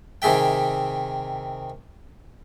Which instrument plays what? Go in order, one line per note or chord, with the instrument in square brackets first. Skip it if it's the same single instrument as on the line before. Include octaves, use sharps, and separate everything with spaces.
[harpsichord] C3 D#3 G#4 E5 G5